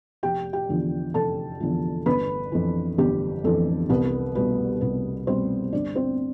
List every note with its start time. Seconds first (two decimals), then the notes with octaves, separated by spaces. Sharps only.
0.23 F1 G4 G5
0.53 G4 G5
0.69 E2 D3 F3
1.14 F1 A4 A5
1.60 E2 D3 F3
2.06 G1 B4 B5
2.52 F2 E3
2.98 G1 G4
3.44 F2 E3 A4
3.89 C2 B3 B4
4.35 B2 G3 B3 B4
4.81 C2 B3 B4
5.27 B2 G3 C4 C5
5.73 G1 D4 D5
5.96 C4 C5